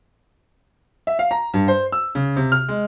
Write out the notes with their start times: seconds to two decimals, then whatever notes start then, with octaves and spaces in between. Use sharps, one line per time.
1.07 E5
1.19 F5
1.31 A#5
1.54 G2
1.68 C5
1.92 E6
2.15 C#3
2.37 C3
2.52 F6
2.69 G#3